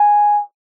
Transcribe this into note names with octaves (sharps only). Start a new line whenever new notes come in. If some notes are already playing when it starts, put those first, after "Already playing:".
Already playing: G#5